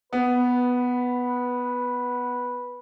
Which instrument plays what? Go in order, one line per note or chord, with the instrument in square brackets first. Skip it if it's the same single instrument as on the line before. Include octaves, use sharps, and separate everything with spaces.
[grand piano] B3 [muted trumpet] B4